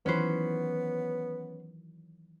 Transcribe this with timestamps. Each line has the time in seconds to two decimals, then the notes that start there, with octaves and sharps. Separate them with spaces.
0.06 D#3 E3 F#3 B3 C#4 B4 C5